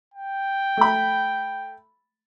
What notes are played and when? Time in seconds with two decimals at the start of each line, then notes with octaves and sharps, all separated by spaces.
0.14 G5
0.77 A3 B5